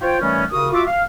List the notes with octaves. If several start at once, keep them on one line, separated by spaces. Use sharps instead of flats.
F4 C5 C#5 G5
D#3 E3 G3 A3 B3 C#4
C2 C#3 F#4 A#4 D#6
F4 F#4 E5 D6
F5